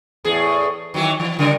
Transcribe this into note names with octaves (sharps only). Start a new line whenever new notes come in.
E2 A2 G#4
D#3 E3 F#3
E3
C#3 G3 A#4